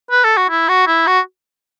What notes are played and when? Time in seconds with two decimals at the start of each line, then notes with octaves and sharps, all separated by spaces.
0.11 B4
0.24 A4
0.37 F#4
0.50 E4
0.69 F#4
0.87 E4
1.07 F#4